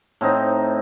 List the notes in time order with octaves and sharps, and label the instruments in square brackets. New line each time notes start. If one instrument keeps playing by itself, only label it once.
[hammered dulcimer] A2 C4 D#4